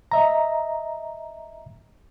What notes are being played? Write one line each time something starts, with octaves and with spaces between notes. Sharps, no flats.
D#5 E5 A#5